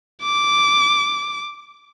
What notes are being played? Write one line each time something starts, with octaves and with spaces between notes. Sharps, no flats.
D6